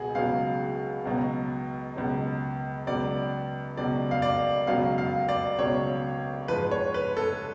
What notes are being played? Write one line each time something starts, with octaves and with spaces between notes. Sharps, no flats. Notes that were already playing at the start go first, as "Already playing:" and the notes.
Already playing: C#2 B2 F#3 F#4 G#4
C#2 B2 F#3 F5
C#2 B2 F#3
C#2 B2 F#3
C#2 B2 F#3 D5
C#2 B2 F#3 D5
F5
D5
C#2 B2 F#3 F5
F5
D5
C#2 B2 F#3 C#5
G#2 F3 B4
C#5
B4
A4